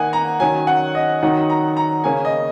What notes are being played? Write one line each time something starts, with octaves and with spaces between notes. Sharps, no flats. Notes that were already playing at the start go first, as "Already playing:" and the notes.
Already playing: D#3 A#3 D#4 F#5 G#5
A#5
D#3 F#3 C#4 G#5
F#5
D#5
D#3 F#3 D#4 F#5
A#5
A#5
C#3 A#3 C#4 G#5
D#5